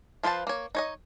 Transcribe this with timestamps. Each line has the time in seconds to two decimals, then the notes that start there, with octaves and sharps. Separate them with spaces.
0.23 F3 F4 B4 C5 A5
0.47 A#3 C#5
0.75 D#4 C#5 D#5